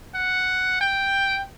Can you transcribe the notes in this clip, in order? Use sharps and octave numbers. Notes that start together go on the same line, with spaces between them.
F#5
G5